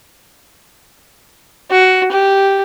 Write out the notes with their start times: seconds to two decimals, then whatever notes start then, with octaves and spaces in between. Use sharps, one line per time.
1.71 F#4
2.12 G4